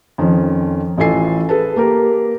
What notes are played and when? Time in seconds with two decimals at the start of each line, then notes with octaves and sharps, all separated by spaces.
0.18 F2 D#3 F3 C#4
0.98 A1 E3 F4 A4 G#5 C7
1.49 G#4 A4 B4 A5
1.76 A#3 G4 A#4